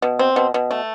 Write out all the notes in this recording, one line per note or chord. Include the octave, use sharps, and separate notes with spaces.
B2
C4
B2
B2
A3